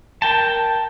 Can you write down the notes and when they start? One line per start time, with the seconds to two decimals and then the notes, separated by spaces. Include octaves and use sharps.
0.22 A#4 G5 A5